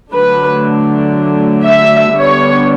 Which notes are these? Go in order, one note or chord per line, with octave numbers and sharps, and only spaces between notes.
D3 F#3 A3 D4 B4
E5
D3 G3 B3 D4 C#5